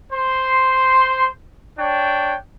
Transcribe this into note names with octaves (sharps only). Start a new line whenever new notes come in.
C5 C6
D4 C#5 G5